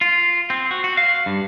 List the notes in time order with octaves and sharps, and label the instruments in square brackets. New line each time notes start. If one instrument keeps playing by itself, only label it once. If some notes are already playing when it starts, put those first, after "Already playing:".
[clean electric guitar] F4
C4
F#4
F#4
F5
G2